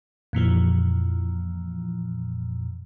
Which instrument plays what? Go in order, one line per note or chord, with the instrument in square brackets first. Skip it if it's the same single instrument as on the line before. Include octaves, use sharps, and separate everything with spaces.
[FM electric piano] F2 A#2 E3 F3